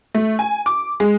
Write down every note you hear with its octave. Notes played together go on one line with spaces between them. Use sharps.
A3
G#5
D6
G#3